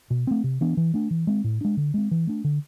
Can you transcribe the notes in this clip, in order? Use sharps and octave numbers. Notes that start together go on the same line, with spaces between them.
B2
A3 C4
C3
E3 B3 D4
E3
A3 D4
E3
G#3 C4
A2
G#3 D4
D3
G#3 C4
E3
A3 D4
D3